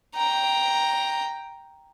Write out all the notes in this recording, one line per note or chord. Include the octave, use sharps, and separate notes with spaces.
G5 A#5